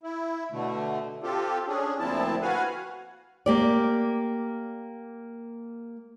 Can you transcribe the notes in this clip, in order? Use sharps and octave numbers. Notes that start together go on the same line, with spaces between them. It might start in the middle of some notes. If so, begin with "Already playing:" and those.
E4
B2 D3 A3
C4 F4 G4 A4
C#4 D4 G#4
D2 A#2 F3 C4 E4 A5
F#4 B4 F5 F#5 G#5
A#3 G4 D5